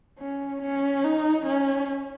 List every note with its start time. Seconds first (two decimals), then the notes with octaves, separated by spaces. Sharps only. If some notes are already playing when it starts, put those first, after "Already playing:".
0.19 C#4
0.63 C#4
1.04 D#4
1.46 C#4